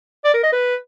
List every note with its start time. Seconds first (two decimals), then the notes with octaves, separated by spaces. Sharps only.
0.24 D5
0.34 A#4
0.43 D#5
0.52 B4